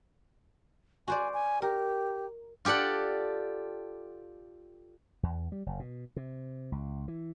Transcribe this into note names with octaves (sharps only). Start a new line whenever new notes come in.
F#4 C5 D5 G#5
G#5
G4 A#4
F4 G4 A4 D5 F#5
E2
G3
F#1
B2
C3
C#2
E3